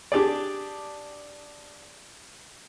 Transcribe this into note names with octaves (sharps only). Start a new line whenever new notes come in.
D4 G4 G#4 D5